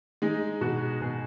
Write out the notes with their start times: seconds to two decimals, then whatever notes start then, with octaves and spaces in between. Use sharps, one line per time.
0.22 G#3 D#4
0.61 B2 F#4
1.01 B2 G#4